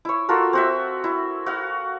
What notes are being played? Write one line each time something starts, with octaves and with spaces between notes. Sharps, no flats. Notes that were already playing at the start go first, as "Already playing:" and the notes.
E4 C#5
F4 F#4 A4 A#4
C4 F#4 E5
E4
F#4 F5